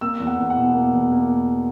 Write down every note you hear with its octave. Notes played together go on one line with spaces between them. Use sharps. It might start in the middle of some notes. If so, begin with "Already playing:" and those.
A#3 E6
E2
F#5
E2
F#5
B2
A#3
E2
A#3